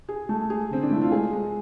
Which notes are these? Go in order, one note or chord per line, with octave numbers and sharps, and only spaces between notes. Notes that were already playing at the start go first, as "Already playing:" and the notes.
G#4
A3
G#4
D3 C4
D4
A3 E4
F4
G#3 G#4
G#3